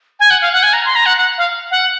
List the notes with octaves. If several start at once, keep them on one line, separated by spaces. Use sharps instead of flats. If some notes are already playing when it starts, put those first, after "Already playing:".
G#5
F#5
F5
F#5
G#5
A#5
C6
A#5
F#5
F#5
F5
F#5